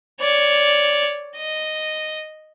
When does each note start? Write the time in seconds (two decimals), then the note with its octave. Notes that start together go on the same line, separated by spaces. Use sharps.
0.20 C#5 D5
1.36 D#5